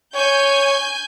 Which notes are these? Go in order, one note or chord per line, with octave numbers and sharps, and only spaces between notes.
C#5 G#5 G6